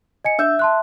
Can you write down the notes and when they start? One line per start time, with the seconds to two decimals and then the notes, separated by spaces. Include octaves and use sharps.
0.25 D#5 G#5 C#7
0.39 D4 E5 E6 G6
0.59 A5 C6 F#6